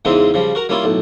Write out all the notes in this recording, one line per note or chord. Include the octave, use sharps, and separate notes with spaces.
E2 C#3 E3 G#3 C4 D#4
C#3 F3 G3
F#4 A#4 A#5
G3 A#3 C#4 E4 F4
B1 A2